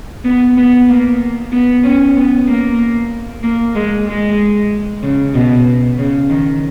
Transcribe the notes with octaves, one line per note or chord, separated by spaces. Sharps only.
B3
B3
A#3
B3
C#4
B3
A#3
A#3
G#3
G#3
C#3
B2
C#3
D#3